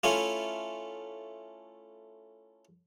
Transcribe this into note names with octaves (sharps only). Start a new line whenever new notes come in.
A3 C#4 E4 F4